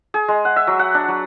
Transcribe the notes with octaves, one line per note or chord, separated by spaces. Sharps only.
G#4
G#3
F#5
E5
F#3
F#5
D4
F#3